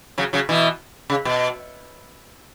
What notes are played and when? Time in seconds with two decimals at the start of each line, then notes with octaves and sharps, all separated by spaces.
0.18 C#3 F#3
0.33 C#3 F#3
0.49 B2 E3
1.10 C#3
1.25 B2